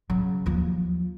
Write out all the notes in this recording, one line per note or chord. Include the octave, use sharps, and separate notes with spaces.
C#3 F#3
D#2 F3